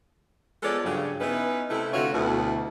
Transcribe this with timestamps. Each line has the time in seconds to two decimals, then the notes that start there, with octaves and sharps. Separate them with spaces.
0.63 F3 G#3 B3 A4 C#5 D5
0.84 G2 C#3 F#3
1.21 B3 C#4 D#4 E4 B4
1.71 C3 A3 E4
1.93 F2 D3 A3 F4 F#4 C#5
2.13 D2 B2 E4